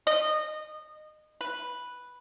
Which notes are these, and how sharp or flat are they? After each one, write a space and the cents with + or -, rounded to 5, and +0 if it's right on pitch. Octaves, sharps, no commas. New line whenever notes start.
D#5 -25
B4 -5